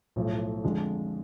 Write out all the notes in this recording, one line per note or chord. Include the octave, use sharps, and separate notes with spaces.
B1 A2 F3
F2 D3 G#3